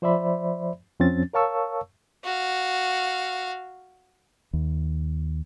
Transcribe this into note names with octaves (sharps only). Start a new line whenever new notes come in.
F3 C5 D5 E5 B5
F2 F3 C4 C#4 A6
A#4 C#5 F5 A5 C#6 E6
F#4 F5
D#2